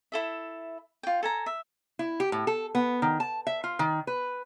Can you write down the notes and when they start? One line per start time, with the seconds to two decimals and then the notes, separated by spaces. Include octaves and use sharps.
0.12 E4 A4 E5
1.03 F4 G5
1.23 A4 G#5 A#5
1.46 E5
1.99 E4
2.20 G4
2.32 A2
2.47 A4
2.75 B3
3.02 D#3
3.20 A5
3.47 E5
3.64 F4
3.79 D#3
4.07 B4